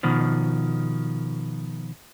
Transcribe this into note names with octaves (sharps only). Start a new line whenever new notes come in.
B2 D#3 F3